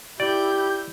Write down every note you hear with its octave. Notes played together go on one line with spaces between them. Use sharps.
E4 G4 D5 G6